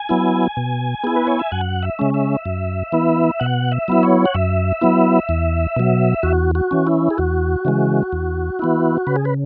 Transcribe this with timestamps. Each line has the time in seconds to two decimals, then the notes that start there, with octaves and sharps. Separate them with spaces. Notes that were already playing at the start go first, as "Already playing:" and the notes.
Already playing: G#5
0.09 F#3 B3 E4
0.57 B2
1.04 B3 E4 G#4
1.16 B4
1.27 C#5
1.39 E5
1.52 F#2 F#5
1.83 E5
1.99 C#3 G#3 C#4
2.14 E5
2.45 F#2
2.92 E3 B3 E4
3.40 B2 F#5
3.72 E5
3.88 F#3 B3 E4
4.03 C#5
4.25 F#5
4.34 F#2 E5
4.81 F#3 B3 E4
5.29 E2
5.76 B2 F#3
6.23 E2 F#4
6.55 F#4
6.71 E3 C#4
6.87 E4
7.10 G#4
7.18 E2 F#4
7.65 C#3 E3 G#3
8.13 E2
8.59 E3 B3 E4
9.07 C#3 B4
9.16 G#4
9.25 B4